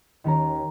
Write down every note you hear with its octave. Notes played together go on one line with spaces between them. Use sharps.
D#2 D#3 C#4 A#5